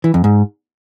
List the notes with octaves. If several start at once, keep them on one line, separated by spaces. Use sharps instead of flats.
E3
F2
G#2